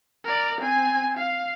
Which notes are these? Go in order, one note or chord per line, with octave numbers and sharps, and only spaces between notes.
A#4 D5
C4 G#5
F5